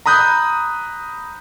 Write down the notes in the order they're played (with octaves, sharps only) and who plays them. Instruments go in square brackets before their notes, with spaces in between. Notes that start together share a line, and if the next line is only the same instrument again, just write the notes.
[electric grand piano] A#5 B5 D#6 F#6 G6